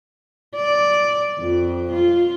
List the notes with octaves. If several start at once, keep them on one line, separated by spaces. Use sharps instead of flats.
D5
F2
F4